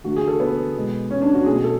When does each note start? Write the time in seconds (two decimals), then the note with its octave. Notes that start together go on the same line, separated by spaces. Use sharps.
0.04 D3 A3 F#4
0.16 G#4
0.28 A4
0.40 B3
0.75 B2 G#3
1.11 C#4
1.22 D4
1.35 F#4
1.46 B2 F#3 A3 G#4
1.64 A4